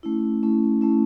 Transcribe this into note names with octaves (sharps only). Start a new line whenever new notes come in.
A3 C#4 E4
A3 C#4 E4
A3 C#4 E4